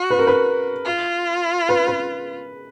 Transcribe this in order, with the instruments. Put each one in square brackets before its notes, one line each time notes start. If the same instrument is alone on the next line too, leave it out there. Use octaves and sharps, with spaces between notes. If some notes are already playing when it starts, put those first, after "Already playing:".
Already playing: [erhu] F#4
[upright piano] B4
A#4
B4
[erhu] F4
[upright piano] B4
B4